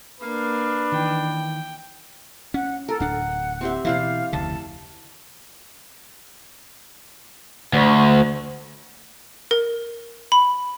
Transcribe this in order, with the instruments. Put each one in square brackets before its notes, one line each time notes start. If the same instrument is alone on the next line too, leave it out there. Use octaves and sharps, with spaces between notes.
[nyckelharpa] A#3 F5 [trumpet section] D4 B4
[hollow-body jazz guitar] D#3 E3 [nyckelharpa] G5
[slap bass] C#4 [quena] F#5
[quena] A4 [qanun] A#4
[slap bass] D1 D4 [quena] F#5
[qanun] C4 G4 E5
[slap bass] B2 E3 [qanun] E4 C5 D5 [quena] F5
[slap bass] F1 D2 C#3 [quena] A5
[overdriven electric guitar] D2
[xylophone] A#4
B5